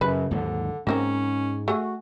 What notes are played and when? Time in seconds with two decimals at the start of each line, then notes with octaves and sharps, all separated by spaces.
0.01 F#2 C#3 F#3 B4
0.31 D#2 G#2 D3 F#3
0.87 G#2 A#3 C4 C#4 A#4
1.68 A3 F#4 G#4